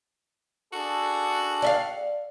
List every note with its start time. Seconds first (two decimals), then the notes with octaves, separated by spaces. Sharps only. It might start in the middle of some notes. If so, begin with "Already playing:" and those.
0.73 D4 F#4 G#4 A4
1.62 D5 E5 F5